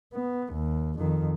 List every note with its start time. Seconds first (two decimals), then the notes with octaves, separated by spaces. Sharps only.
0.13 B3
0.53 D#2
0.99 F2 D#3